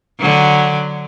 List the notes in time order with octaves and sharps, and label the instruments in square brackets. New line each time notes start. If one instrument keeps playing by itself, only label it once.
[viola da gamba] D3 F#3